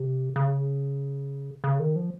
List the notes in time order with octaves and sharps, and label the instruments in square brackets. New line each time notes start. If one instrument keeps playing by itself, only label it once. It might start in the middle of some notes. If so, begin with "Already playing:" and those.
Already playing: [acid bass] C3
C#3
C#3
D#3
F3